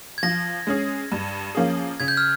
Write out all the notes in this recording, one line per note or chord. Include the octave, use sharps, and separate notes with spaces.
G#6
F3 A#6
G#3 C#4 G#4
G2
F3 A#3 C#4 G#4
C#3 G#6
G6
F6